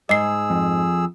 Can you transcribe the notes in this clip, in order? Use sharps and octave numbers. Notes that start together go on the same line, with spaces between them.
G#2 G#4 D#5 E6 C7
F2